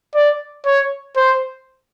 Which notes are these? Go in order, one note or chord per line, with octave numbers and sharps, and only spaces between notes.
D5
C#5
C5